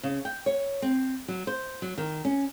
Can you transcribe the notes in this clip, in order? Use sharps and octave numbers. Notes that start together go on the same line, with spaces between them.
C#3
G5
C#5
C4
F#3
C5
F#3
D#3
C#4